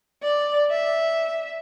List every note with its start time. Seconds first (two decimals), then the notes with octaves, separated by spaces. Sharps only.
0.22 D5
0.71 E5